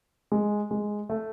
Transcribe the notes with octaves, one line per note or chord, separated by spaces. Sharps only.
G#3
G#3
A3